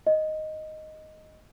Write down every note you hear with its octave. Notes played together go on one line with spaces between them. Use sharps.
D#5